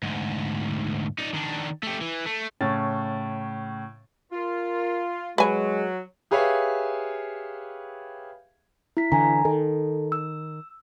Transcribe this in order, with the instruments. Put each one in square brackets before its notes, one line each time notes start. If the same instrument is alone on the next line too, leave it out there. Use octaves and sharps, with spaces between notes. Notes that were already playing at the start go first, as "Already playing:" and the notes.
[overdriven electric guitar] D2 G#2
D#4 D5
D#3 D4
A3 G4
E3
A3
[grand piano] A2 C#3 C#4 A6
[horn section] F4 [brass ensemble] A#4
[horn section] F#3 [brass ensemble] G#3 [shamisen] B4 G#5
[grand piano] G4 G#4 B4 C#5 E5 F5
[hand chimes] E4 B6
[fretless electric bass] D3 E3 [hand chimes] G#5 A#5
[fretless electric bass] D#3 [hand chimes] A4
[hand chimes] E6